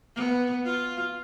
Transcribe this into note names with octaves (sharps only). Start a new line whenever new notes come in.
B3
F4